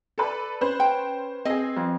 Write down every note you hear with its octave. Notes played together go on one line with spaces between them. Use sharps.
A4 B4 D5
C#4 B4 C5
G5
C4 G#4 D#5
F2